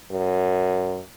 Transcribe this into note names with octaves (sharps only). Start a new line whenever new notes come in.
F#2